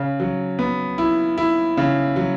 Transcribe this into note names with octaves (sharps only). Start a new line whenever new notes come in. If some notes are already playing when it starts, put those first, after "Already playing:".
Already playing: C#3
F#3
B3
E4
E4
C#3
F#3